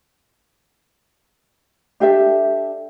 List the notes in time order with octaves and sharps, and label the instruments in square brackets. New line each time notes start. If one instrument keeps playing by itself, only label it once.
[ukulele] D4 G4 A4 E5